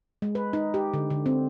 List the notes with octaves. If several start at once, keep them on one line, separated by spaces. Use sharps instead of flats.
G#3
B4
D#4
G4
D3
D3
C4